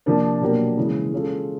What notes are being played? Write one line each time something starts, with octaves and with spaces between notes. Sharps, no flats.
C3 F3 A#3 D4
B2 F#3 A#3 D4 G4
C#3 E3 G#3
G#3 C#4 F4 A4